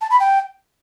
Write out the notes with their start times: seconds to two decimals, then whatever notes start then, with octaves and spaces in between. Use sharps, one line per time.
0.01 A5
0.10 B5
0.20 G5